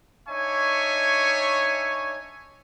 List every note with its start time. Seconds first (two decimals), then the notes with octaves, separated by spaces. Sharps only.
0.28 D4 D#4 C#5 E5 G#5 C#6